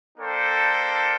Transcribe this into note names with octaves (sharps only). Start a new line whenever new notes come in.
A#3 D4 A4 C5 G5